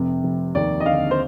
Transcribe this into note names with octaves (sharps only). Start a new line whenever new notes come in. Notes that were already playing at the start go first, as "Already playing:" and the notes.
Already playing: F1 C3
F1
D#2 D5
D#5
D3 F5
C5